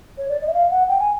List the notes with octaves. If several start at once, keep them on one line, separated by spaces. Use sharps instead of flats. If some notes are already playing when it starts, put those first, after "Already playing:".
C#5
D5
D#5
E5
F5
F#5
G5
G#5